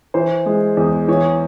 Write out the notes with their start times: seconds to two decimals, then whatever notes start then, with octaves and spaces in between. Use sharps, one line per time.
0.14 E3 C5
0.46 G#3
0.77 E2
1.08 E3 C#5